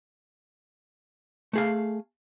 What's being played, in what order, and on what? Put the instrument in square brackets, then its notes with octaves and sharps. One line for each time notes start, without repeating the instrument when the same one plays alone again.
[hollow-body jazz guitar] A3 G#4 F5